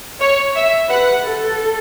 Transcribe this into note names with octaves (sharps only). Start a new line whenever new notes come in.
C#5
E5
B4 F#5
A4